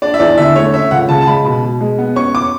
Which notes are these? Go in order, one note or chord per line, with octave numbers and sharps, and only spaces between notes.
D4 D5
E5
E2 D5
D3 E5
A3 C#5
C#4 E5
C#2 F#5
C#3 A5
A5
G#3 B5
B2
B2
G#3
B3
C#4 C#6
D6